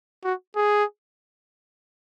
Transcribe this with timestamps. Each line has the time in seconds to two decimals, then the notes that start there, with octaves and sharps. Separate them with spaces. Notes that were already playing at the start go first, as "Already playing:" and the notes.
0.24 F#4
0.56 G#4